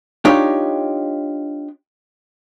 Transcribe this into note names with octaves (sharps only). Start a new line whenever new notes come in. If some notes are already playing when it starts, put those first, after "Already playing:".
D4 D#4 F4 G4 C#5